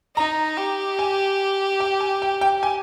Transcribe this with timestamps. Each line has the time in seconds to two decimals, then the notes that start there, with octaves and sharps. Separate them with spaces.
0.17 D#4 A#5
0.58 G4
0.99 G#5
1.80 G5
2.01 G#5
2.22 G5
2.41 G5
2.63 G#5